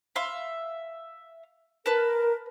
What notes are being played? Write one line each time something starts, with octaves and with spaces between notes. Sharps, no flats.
E5 F5 C6
A#4 B4 A5